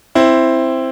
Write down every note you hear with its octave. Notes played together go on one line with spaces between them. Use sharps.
C4 E4